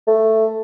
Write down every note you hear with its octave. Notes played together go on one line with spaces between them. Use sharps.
A3